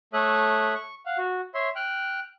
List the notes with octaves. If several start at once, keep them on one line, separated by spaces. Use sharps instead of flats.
A3 A4 C#5 E5 D#6 F#6
C#6
F5 F#5
F#4
C#5 E5 C6
G5 F6 F#6